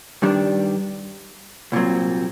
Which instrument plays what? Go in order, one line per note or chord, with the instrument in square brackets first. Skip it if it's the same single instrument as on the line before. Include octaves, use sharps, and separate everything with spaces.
[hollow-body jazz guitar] G2 D#3 G3 D4
C2 A#2 F#3 C4